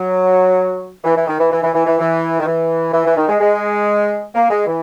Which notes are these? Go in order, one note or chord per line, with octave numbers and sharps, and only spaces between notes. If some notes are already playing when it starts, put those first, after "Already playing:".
Already playing: F#3
E3
E3
D#3
E3
E3
E3
E3
E3
E3
D#3
E3
E3
E3
D#3
G#3
G#3
A#3
G#3
E3